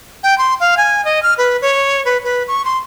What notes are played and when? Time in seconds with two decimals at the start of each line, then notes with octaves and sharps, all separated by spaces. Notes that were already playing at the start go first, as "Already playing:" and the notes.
0.23 G5
0.38 C6
0.60 F5
0.77 G#5
1.05 D#5
1.23 F6
1.38 B4
1.62 C#5
2.05 B4
2.24 B4
2.48 C#6
2.65 C6